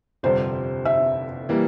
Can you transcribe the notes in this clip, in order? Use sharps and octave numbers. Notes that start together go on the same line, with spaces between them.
G1 F2 C3 G3 C5
E5
E3 G3 A#3